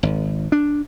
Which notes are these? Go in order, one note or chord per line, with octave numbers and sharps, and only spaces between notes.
G#1
D4